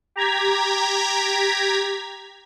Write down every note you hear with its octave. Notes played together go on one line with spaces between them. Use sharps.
G4 A#5 G#6 B6